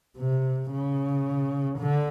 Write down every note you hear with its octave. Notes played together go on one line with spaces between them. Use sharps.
C3
C#3
D3